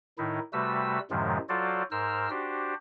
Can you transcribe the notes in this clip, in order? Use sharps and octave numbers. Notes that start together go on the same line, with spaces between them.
A2 D#3 D#4 E4
C3 G3 A3 F#4 B4 E6
F#2 A2 C3 D#3 F3 G#3
F#3 F4 F#4 A4 C5 D5
G#2 A#4 C5 E6 F6
D4 F#4 G4 C5